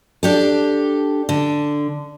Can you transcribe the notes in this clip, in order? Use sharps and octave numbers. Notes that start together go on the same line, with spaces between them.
D4 G4 A4
D3